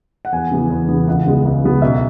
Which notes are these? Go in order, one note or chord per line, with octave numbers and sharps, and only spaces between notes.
F#5
E2 G#5
C#3 E3 B3
E2
C#3 E3 B3
C#2 F#5
C#3 G#3 B3
C#2
C#3 G#3 B3
B1 E5